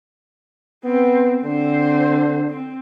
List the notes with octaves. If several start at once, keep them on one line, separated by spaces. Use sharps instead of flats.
B3 C4
D3 C4 C5
C4